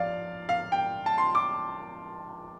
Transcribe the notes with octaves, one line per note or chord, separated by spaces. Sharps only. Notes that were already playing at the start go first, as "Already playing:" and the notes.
Already playing: F3 D5 F5
F5
G5
A5
C6
D6